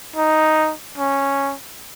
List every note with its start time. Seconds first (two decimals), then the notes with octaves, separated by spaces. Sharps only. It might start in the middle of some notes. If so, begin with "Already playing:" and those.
0.16 D#4
0.98 C#4